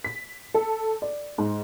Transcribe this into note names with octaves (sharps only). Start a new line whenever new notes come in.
B6
A4
D5
G#2